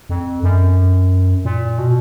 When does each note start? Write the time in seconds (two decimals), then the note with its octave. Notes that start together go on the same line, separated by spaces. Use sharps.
0.10 F2
0.43 F#2
1.45 A#2
1.78 B2